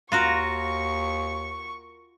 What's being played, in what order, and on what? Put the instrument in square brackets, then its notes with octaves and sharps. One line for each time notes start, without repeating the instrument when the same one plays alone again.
[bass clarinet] D#2 [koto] F4 F#4 A#4 [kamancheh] C#6